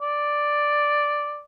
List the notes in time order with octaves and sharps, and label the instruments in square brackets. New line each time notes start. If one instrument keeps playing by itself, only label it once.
[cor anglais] D5